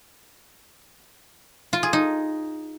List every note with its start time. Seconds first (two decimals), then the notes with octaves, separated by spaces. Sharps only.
1.73 F4
1.83 G#4
1.93 D#4